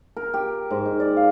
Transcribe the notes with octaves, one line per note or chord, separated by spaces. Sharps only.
A#4
G4
G#2
D#4
D5
F5